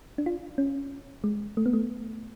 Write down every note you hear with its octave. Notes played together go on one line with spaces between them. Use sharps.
D4
F4
C#4
G#3
A3
B3
A3